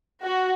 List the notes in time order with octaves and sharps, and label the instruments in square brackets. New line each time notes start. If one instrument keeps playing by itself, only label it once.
[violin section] F#4